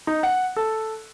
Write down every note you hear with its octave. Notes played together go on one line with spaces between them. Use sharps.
D#4
F#5
A4